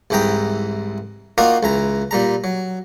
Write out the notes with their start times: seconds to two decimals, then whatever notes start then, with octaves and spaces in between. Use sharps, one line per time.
0.10 C2 G#2 E3 G5 A#5 D#6
1.38 A#3 D#4 F4 F#4 A#4 D5
1.63 C#2 E3 A#5
2.11 A#2 G3 A#5
2.44 F#3